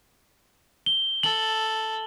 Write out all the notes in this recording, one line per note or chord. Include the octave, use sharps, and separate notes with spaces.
G7
A4 F#7